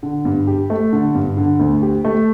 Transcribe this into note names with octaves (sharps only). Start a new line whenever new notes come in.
D3
G2
G4
A3
D3
G2
D3
D2
G4
A3